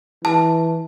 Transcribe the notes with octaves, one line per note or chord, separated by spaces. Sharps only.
E3 A5